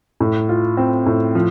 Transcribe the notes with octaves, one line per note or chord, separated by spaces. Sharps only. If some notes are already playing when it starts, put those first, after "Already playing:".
A2
F4
C4
A2
F3